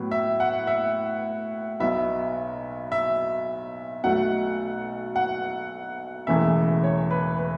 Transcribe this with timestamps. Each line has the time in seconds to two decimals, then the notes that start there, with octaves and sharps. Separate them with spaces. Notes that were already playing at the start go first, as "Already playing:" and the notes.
Already playing: A2 F#3 B3
0.11 E5
0.40 F#5
0.67 E5
1.80 B1 B2 B3 E5
2.92 E5
4.04 B1 B2 F#3 A3 F#5
5.16 F#5
6.27 E1 E2 C#3 E3 A3 E5
6.84 C#5
7.11 B4
7.39 B4